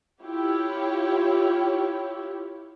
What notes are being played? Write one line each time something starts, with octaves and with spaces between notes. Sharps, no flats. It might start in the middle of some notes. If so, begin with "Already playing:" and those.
E4 F4 G4 C#5